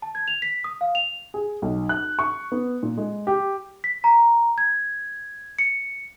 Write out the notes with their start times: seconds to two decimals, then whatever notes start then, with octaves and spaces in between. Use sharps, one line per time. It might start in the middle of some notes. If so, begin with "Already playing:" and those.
0.02 A5
0.15 G#6
0.28 F7
0.42 B6
0.64 D#6
0.81 F5
0.95 F7
1.34 G#4
1.62 B1
1.89 F#6
2.19 C#6
2.52 B3
2.83 A#2
2.98 G#3
3.27 G4
3.84 B6
4.04 A#5
4.58 G#6
5.59 C#7